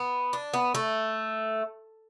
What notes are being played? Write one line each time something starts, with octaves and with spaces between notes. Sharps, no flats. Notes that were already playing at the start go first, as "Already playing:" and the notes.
Already playing: B3
D4
B3
A3